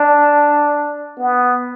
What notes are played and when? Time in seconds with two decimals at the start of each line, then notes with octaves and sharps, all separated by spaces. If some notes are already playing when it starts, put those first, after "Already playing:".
Already playing: D4
1.18 B3